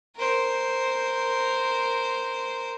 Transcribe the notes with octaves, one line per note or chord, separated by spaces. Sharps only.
A#4 C5